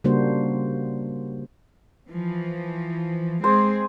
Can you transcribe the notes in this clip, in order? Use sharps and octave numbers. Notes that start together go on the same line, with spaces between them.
C#3 G3 A#3 D4 F#4 C5
E3 F3
G#3 C4 G#4 C5